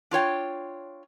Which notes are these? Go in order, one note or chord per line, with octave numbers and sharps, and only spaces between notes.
D4 F4 C#5 G5